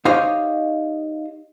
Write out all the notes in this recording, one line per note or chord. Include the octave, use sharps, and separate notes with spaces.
D#4 G4 C5 C#5 D#5 F5